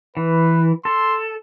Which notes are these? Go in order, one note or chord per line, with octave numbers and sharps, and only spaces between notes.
E3 B4
A4 C6